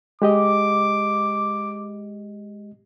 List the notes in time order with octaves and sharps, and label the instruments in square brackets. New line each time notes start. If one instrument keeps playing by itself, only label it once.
[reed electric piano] G#3 G4 D#5 [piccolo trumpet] D6